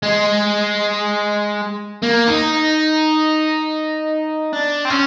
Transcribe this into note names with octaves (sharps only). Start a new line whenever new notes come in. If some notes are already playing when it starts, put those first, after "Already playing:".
G#3
A#3
D#4
D4
C4
C#4